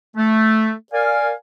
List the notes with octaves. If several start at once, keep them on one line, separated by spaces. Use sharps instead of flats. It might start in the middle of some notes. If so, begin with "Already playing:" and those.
A3
A#4 D5 F5 G#5